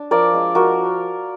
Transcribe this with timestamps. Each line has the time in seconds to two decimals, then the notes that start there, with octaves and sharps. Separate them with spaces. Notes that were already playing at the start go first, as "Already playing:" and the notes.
Already playing: D4
0.11 F3 A#4 D5
0.33 G#3 D4
0.55 F3 F#4 A#4